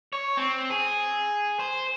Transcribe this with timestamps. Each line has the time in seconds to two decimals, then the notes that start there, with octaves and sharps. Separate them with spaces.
0.13 C#5
0.37 C4
0.70 G#4
1.59 C5